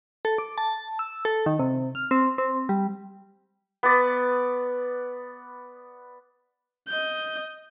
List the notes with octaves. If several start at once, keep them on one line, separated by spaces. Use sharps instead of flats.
A4
D6
A5
E6
A4
D#3
C3
F6
C4
C4
G3
B3 D5
D#5 G6